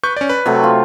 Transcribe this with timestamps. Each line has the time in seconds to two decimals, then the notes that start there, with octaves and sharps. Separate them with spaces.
0.03 B4 C#6 G6
0.16 C#4 D5
0.29 B4
0.46 C3 F#3 A3
0.63 F4